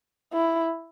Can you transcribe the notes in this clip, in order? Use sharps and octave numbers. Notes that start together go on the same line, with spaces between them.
E4